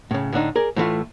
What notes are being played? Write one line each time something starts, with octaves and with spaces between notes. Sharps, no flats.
A2 C#3
A2 D3 D4 D#4
G#4 A#4 D5
A2 E3 A3 F4